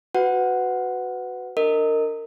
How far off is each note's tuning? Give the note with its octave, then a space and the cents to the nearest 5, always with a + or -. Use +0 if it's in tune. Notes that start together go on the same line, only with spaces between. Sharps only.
F#4 +0 B4 +20 F#5 +0
D4 +10 A#4 -25 D#5 +0